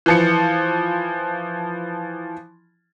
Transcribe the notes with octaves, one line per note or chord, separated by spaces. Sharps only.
E3 F3 C#7